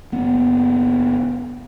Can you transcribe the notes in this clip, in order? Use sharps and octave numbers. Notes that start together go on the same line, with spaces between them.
F#1 B3